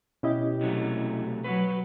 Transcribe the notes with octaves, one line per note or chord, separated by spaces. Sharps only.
B2 C#4 E4 G4 D#5
C3 F#3 A3
F#3 B4